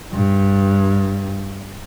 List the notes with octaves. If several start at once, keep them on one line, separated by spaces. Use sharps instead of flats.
G2